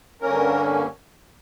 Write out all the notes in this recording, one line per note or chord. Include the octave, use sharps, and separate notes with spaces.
G2 D3 A#3 C#4 A#4